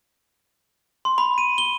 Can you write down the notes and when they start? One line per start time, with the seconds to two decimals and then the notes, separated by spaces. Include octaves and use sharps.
1.05 C6
1.18 B5
1.38 D#7
1.58 G7